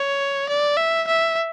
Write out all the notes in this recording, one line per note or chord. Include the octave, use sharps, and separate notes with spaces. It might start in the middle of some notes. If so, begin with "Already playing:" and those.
Already playing: C#5
D5
E5
E5